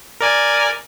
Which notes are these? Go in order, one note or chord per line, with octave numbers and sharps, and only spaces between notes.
A#4 D5 G#5